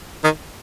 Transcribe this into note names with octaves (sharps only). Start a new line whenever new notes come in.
D#3